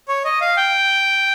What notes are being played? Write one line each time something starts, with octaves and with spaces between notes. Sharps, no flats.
C#5
D#5
F5
G5